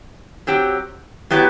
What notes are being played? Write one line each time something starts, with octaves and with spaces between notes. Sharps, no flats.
F#3 C4 G4
F#3 B3 E4 G4